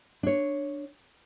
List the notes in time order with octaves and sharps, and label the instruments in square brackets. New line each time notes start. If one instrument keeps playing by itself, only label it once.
[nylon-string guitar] D4 C#5